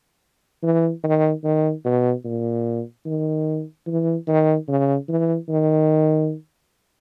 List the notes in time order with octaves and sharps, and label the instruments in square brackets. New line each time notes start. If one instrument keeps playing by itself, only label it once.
[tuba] E3
D#3
D#3
B2
A#2
D#3
E3
D#3
C#3
E3
D#3